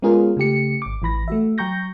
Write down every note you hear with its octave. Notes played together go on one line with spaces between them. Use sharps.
G#3 B3 C#4 F4 G#4 A#4
C#3 A3 G4 C#7
G#1 D6
A1 E3 B5 A#6
A3 F#4 E5
F#3 G5 A#5 C#6 G6 A#6